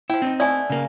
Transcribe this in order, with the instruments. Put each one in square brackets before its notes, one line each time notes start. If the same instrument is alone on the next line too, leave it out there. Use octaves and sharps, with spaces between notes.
[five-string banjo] F3 G5 [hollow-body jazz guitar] E4
[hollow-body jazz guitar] C4 C#4 D#4
[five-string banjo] A3 B3 E4 [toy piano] D5 G#5
[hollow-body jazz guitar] C#3 A#3